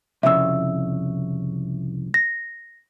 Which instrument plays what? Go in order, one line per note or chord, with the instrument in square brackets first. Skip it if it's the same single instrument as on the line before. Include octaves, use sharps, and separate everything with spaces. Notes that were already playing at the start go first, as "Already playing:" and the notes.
[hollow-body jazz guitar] C2 F2 C#3 [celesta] E5 E6
[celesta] A#6